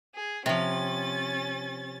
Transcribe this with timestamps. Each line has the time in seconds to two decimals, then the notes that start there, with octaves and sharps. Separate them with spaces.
0.15 G#4
0.46 C3 F3 C#4 A6